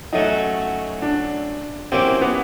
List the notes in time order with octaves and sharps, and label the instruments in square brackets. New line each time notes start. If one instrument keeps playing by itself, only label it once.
[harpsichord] F#3 A3 C#4 F#4 [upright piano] D#4
[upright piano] D4
[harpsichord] F#3 A#3 C#4 E4 G4 [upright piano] C4
[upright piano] B3